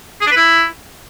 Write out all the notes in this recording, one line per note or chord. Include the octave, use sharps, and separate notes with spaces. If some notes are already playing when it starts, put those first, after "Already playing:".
G#4
D4
B4
E4